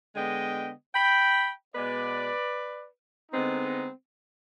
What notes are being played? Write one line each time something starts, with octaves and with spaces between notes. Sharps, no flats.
D3 G#3 B3 D#5 G5
G5 B5
B2 G#3 B3 B4 D5
D3 G#3 B3 C4 D#4